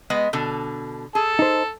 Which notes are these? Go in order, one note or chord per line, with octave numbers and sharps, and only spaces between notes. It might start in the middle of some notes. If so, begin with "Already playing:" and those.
G#3 B3 D#5
B2 D3 A4
G#4 A4
D#4 C5